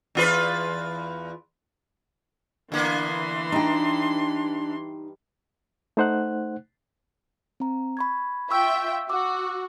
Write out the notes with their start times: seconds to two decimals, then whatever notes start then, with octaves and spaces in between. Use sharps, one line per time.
0.15 E2 F4 B4
2.72 D3 E3 A#3 B3 C6
3.52 G2 D4 D#4 G5
5.97 A3 D#4 C5 F#5 F#6
7.60 C4 A#5
7.97 B5 C#6 G#6
8.51 F4 E5 G5 C#6 E6
9.09 F#4 D6 E6